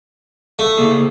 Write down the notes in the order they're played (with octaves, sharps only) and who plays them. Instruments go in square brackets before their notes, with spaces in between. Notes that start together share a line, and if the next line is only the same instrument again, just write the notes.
[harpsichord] A3
[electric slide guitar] C#3 A#3 G#4